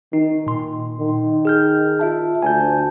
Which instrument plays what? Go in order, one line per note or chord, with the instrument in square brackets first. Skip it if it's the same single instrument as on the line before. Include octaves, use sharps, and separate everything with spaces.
[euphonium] D#3 [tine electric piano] D#4
[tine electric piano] A#2 C6
[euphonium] D#3
[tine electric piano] G#4 F6 G6
F4 E5 A5
[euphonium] D2 [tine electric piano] G#5 A5 G6